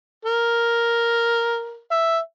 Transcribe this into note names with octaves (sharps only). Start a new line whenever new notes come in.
A#4
E5